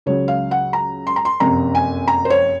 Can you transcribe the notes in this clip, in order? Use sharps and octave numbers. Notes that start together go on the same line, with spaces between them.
C#2 C#3 F#3 C#5
F5
F#5
A#5
C6
A#5
C6
F#1 F2 C3 A#5
G#5
A#5
C5
C#5